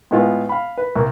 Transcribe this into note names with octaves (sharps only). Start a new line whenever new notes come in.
A2 G#3 B3 F4
F5 B5
B4
C2 A#3